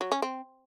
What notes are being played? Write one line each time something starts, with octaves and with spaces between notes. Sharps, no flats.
F#3
C#4
C4